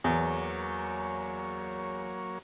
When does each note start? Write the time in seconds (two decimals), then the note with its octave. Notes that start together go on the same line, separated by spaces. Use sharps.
0.04 E2 F#3 A#3 C#5